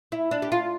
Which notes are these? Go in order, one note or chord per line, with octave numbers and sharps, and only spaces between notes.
E4
D4
G4
F4